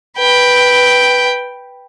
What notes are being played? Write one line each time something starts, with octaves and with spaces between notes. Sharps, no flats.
B4 G5